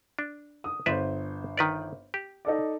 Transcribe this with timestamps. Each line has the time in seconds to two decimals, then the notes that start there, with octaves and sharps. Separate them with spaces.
0.19 D4
0.64 D#6
0.86 G1 B4 C5 D5 E5
1.57 D#3 B4 D5
2.14 G4
2.45 D#4 A4 D5